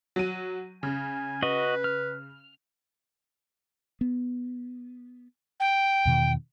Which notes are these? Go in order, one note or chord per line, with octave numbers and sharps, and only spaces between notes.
F#3 D#7
C#3 G#5
F#4 B4 D#5
F6
B3
G5
E2 B2 D#3